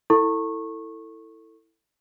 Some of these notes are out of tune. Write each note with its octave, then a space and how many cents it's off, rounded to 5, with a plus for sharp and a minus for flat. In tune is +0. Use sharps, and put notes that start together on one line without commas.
E4 -5 A4 +20 C#6 -20